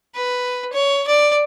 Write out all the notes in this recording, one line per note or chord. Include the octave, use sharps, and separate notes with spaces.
B4
C#5
D5